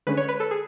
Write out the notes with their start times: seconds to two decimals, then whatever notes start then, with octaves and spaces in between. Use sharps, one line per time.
0.07 D3 G#3 C#4 B4
0.17 C#5
0.29 B4
0.40 A4
0.51 G#4